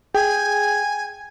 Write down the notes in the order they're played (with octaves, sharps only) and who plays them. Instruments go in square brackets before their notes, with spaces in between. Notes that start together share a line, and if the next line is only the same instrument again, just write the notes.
[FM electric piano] G#4 [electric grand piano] G5 [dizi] G#5